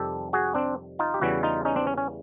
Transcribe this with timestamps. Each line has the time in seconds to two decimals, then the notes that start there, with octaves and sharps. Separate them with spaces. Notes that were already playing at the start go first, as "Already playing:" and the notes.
Already playing: F2 C3 D#3 G3 C4 G4 A4
0.33 F#4 G#4
0.54 C4 D4
0.99 D#4 F4
1.14 G4
1.21 E2 C#3 E3 G3 E4 F#4
1.43 D#4 F4
1.65 C#4 D#4
1.76 C4 D4
1.87 C#4
1.98 C#4